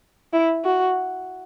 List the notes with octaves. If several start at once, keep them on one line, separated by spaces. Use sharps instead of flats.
E4
F#4